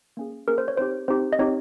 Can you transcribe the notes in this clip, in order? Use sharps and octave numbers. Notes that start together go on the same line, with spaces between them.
A#3 C#4 G#4
A#3 C#4 G#4 A#4
C5
C#5
C4 D#4 G4 C5
C4 D#4 G4 C5
D#5
C4 D#4 G4 C#5